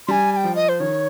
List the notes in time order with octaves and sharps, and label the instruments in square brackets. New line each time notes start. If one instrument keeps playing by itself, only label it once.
[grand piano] G3 [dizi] G#5 C6
[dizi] G#5
G5
[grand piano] F3
[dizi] D#5
C5
[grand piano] D#3 [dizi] C#5